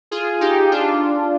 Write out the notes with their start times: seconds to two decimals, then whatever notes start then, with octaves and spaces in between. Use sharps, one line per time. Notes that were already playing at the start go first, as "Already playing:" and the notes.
0.11 F4 G#4
0.41 D#4 G4
0.72 D4 F4